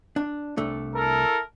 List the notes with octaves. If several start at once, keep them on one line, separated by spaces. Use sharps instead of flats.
D4
C2 A3 D4
E4 A4 A#4